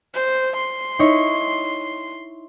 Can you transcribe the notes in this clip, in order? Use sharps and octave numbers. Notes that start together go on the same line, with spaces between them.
C5
C6
D#4 E4 C#5